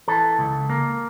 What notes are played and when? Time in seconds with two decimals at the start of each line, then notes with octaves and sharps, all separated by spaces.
0.08 E3 A4
0.39 C#2
0.70 A#3